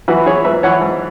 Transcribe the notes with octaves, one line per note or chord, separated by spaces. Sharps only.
E3 F#4 B4
E3 G#4 C#5
G#2 B4 E5
E3 C#5 F#5
G#2